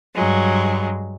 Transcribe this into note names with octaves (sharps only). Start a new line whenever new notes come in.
G2 F#3 G#3